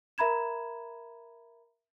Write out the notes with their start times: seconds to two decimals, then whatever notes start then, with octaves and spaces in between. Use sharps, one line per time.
0.18 A#4 E5 A#5 B5 G#6 E7